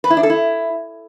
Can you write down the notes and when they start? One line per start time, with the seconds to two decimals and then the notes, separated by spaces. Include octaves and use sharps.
0.04 B4
0.10 E4
0.17 D4
0.23 A4
0.30 E4